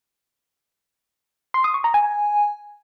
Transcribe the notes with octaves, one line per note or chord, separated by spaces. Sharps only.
C6
D#6
C#6
A#5
G#5